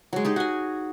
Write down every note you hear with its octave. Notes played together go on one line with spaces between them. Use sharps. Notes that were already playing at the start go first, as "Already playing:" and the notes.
F#3 G#3
D#4 G4 G#4
F#4 G#5